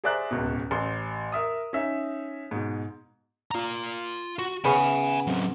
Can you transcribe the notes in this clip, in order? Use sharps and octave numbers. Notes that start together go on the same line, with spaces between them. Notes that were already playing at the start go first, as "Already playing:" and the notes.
G#4 C5 D5 E5 A#5 F#6
D1 C#2 B2
A1 C6
A#4 E5 D#6
C#4 D#4 E5
G#2 B2
F4 A#5
F#4
C#3 B3 C#4 G#5 B5
F#3 C4